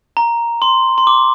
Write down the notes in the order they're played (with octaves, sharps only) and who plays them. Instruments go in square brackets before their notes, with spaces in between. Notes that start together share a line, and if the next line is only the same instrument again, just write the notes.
[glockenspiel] A#5
C6
C6
D6